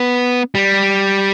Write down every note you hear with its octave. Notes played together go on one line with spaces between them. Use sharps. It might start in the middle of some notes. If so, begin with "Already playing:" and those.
Already playing: B3
G3